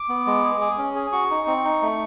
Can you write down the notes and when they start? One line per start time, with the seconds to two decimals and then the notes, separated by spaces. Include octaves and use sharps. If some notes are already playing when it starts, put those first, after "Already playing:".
Already playing: D6
0.09 B3
0.27 G#3
0.44 G#4
0.61 G#4
0.78 C#4
0.95 G#4
1.12 F#4 C#6
1.31 D#4
1.47 C4
1.64 D#4
1.82 A3